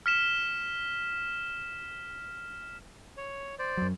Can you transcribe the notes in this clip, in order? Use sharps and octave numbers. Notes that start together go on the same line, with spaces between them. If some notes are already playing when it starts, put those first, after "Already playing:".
F6 B6 E7
C#5
C5 D5
F#2 F#3